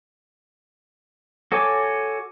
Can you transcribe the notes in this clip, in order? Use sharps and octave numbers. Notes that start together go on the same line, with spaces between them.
F#4 A4 C#5 G#5 D6